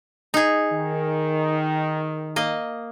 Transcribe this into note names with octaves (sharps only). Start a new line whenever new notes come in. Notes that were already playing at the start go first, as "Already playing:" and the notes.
D#4 G#4
D#3
A#3 D#5